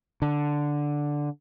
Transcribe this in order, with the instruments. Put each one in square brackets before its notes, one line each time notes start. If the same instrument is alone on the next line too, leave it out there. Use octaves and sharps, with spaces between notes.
[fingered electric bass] D3